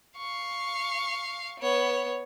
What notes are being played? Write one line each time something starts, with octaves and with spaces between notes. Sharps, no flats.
F5 C#6
B3 C#5